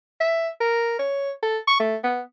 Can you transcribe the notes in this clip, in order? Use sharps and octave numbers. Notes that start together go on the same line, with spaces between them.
E5
A#4
C#5
A4
C#6
A3
B3